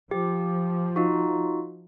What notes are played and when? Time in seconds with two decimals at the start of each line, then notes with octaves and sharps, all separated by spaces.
0.11 F3 G4
0.96 D#4 F4 F#4